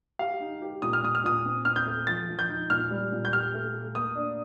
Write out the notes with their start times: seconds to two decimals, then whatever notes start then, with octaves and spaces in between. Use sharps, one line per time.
0.19 G4 F5
0.40 D#4
0.62 G4
0.82 A#2 D#6
0.93 F6
1.03 A#2 D#6
1.15 F6
1.24 A#2 D#6
1.46 C4
1.65 C4 F6
1.76 G6
1.86 A3
2.07 F3 A6
2.29 F3
2.39 G6
2.49 D#4
2.70 A#2 F6
2.90 G3
3.12 A#2
3.25 G6
3.33 G4 F6
3.54 A3
3.74 A3
3.95 A#3 D#6
4.15 D4